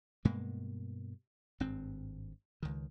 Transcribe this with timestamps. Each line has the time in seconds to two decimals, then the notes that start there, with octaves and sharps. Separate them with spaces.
0.25 G2 B2 G#3 A#3
1.60 G#1 G2 C4
2.63 C#2 D#3